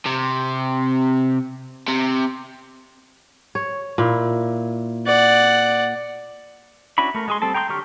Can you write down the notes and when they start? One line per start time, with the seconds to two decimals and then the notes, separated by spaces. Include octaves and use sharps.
0.06 C3
1.88 C3
3.55 C#5
3.98 A#2 E4
5.06 D5 F#5
6.98 C#4 D4 E4 F#4 B5
7.15 A3 A#4
7.28 G#3 G#4 C6
7.42 G3 C4 A4 A5
7.54 G5 A#5 C6 C#6 G6
7.69 D3 F#3 G4 C#6 F6